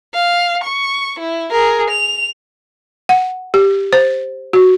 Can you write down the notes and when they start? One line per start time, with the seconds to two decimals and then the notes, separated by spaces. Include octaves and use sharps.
0.14 F5
0.64 C#6
1.20 E4
1.51 G#4 A#4
1.90 F7
3.09 F#5
3.54 G4
3.93 C5
4.53 F#4